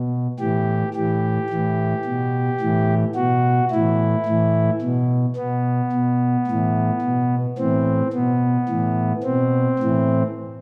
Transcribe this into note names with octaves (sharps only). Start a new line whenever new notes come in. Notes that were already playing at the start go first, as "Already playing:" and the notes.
Already playing: B2
A2 E3 G4
A2 E3 G4
A2 E3
B2
A2 E3
B2 F#4
A2 E3 E4
A2 E3
B2
B2 B3
B2
A2 E3
B2
A2 E3 C4
B2 B3
A2 E3
B2 C4
A2 E3